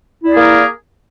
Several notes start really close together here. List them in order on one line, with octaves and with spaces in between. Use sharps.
E4 D5 G#4 A#3 A#4